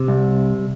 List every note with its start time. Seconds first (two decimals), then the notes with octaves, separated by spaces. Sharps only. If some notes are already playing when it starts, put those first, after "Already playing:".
Already playing: C3
0.08 C2